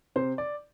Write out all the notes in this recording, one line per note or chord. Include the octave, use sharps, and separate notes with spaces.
C3 C5
D5